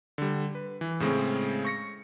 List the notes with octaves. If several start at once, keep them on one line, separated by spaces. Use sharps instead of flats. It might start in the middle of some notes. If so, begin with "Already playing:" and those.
D3 G3
B4
E3
A2 C#3 G#3 C4 C#4
C#6 A#6 C#7